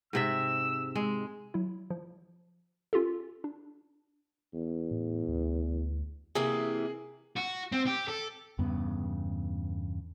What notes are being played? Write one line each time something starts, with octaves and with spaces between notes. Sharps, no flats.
G#2 C3 E5 E6
G#3
F#3 E4
F3
C#4 F4 G4 A4
D4
E2
A2
D2
C3 E3 A#3 G#4
F#4
C4
G4
A4
E2 G2 C#3 B3